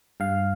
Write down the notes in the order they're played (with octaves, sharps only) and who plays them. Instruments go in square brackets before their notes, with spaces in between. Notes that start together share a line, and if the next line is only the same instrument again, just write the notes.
[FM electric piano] G2 F5